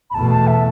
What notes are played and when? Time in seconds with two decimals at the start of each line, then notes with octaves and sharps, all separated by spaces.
0.10 B5
0.14 E2 B2 A3 A5
0.31 A5
0.47 E5